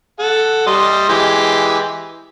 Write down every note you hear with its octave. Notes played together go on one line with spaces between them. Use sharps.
A4 F#5
G3 D#5 C6
E3 G#3 G4